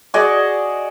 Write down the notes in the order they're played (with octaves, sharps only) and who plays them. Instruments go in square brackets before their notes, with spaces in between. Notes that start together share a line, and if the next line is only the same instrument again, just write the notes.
[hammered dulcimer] F#4 G#4 D5 D#5